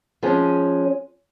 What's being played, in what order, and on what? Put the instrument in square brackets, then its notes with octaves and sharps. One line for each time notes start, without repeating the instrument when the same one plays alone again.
[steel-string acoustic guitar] F3 G#3 C#4